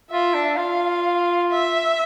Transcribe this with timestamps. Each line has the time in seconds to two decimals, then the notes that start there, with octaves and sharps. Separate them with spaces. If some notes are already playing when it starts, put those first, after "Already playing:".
0.11 F4 E5
0.34 D4
0.57 F4 F5
1.51 E5